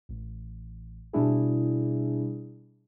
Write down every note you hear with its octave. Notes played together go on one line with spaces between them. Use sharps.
A1
B2 G3 D4 E4 G#4